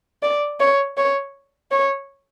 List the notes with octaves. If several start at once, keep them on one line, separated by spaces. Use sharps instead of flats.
D5
C#5
C#5
C#5